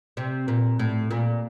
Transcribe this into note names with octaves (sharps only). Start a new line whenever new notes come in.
C3
A#2
A2
A#2